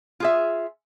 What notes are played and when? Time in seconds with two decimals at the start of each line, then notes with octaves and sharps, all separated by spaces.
0.20 F4 G#4 E5